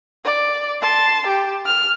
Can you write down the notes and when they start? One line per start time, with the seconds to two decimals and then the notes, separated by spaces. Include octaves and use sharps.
0.25 D5
0.81 A5 C6
1.27 G4
1.66 F6